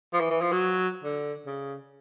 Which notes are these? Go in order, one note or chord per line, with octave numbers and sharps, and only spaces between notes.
F3
E3
E3
F3
F#3
D3
C#3